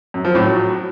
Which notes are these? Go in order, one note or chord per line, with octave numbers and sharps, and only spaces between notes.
F#2
F3
A2
F#3